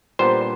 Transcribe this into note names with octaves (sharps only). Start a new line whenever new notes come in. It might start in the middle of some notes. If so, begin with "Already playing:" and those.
A#2 G3 B3 D4 C5